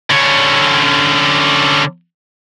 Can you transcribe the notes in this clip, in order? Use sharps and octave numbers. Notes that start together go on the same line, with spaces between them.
D3 C#4